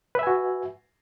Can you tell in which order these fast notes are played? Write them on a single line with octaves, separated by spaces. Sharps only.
B4 E5 G#5 F#4